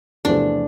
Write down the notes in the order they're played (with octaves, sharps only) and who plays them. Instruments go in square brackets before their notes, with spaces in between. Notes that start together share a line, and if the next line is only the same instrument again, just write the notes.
[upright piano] E2 C3 F3 A3 [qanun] D4